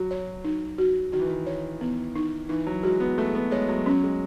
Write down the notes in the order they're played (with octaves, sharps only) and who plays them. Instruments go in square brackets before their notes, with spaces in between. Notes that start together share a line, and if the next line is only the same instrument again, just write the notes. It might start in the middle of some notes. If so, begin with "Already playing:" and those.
Already playing: [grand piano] F#3 [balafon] F#4
[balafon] C#5
D#4
F#4
[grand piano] D#3 [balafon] F#4
[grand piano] E3
D#3
[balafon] C#5
B3
D#4
[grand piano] E3 [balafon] D#4
[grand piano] F#3
[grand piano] G#3 [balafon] F#4
[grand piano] B3
[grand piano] A3 [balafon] G#4
[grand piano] B3
[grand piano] G#3 [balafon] C#5
[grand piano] F#3
[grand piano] F#3 [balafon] C#4
[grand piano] G#3